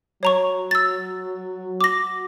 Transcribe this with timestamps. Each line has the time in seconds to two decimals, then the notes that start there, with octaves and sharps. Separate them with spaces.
0.23 F#3 C#5 A#5 C#6
0.71 E6 A6
1.81 F#4 D6 A#6